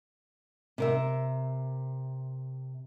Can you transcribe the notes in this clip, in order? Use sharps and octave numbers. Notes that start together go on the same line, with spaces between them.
C3 A#4 E5